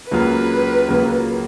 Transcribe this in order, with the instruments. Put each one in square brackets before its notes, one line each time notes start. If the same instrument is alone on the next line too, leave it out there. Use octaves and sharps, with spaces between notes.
[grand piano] C#2 C#3 F#3 A#3 F4 [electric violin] B4
[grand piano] C#2 C#3 F#3 A#3 F4